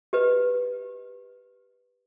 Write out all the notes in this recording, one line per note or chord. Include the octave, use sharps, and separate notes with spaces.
G4 B4 D#5